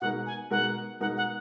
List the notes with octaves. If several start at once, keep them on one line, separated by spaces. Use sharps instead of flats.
B2 G#3 D#4 A#4 F#5
G#5
B2 G#3 D#4 A#4 F#5
B2 G#3 D#4 A#4 F#5
F#5